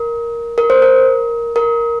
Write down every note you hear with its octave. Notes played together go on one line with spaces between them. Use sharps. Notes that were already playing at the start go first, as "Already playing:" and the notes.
Already playing: A#4
A#4
C5
A#4
A#4